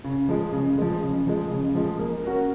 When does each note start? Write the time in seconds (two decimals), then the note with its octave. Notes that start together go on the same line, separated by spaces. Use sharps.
0.04 C#3
0.29 F3 G#3
0.53 C#3
0.78 F3 G#3
1.02 C#3
1.27 F3 G#3
1.51 C#3
1.75 F3 G#3
1.99 A#3
2.24 C#4 F#4 A#4